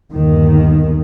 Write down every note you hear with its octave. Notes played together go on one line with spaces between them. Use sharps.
G1 D#2 D#3